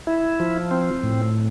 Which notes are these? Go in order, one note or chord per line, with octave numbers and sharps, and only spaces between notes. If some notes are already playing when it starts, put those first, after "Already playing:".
E4
F3
C4
A2